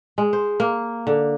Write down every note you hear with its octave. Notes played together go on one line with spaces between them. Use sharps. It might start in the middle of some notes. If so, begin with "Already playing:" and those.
G#3
C5
A#3
D3